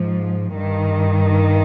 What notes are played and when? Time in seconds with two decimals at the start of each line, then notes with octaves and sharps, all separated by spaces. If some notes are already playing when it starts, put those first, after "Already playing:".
Already playing: G#2 F3
0.56 G2 D#3